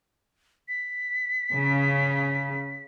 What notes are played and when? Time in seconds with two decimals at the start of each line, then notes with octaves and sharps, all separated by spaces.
0.68 B6
1.53 C#3